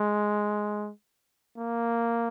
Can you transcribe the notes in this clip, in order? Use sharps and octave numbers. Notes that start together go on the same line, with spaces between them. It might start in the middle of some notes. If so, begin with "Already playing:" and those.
Already playing: G#3
A#3